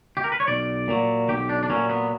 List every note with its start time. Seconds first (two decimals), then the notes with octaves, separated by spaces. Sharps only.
0.17 G4
0.24 A#4
0.32 B4
0.40 C#5
0.47 B1 D5
0.88 A#2 F#3
1.29 B1 G4
1.49 D4
1.63 D4
1.70 A#2 F#3 C#4
1.90 B3